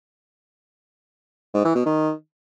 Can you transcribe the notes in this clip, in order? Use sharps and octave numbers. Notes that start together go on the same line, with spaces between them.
G#2
E3
B2
D#3